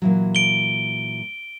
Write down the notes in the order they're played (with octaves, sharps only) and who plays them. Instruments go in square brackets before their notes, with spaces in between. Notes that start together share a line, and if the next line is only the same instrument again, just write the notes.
[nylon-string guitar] A#2 E3 F#3
[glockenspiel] D7 G7